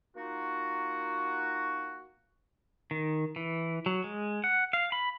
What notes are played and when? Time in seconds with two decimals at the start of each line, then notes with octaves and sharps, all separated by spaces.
0.16 A#3 D#4 F4 F#4
2.91 D#3
3.36 E3
3.86 F#3
4.04 G#3
4.44 F#5
4.73 F5
4.92 B5